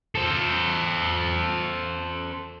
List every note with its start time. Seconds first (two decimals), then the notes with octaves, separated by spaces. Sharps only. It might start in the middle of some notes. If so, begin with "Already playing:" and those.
0.15 A4 C5